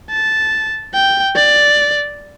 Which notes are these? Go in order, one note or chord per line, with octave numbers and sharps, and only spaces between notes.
A5
G5
D5